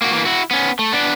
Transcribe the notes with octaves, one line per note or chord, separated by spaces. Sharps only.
A#3 F#4
E3 A#3
E4 F#4
B3 C#4
A3
B3 D4